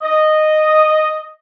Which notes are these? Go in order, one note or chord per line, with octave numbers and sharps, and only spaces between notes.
D#5